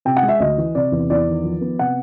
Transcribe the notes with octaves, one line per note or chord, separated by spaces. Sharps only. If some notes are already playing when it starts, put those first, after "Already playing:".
C3 G5
F#5
G#3
E5
D2 D#5
E3
C3 D5
E2
E2 D5
D#3
F3
B3
C3 F#5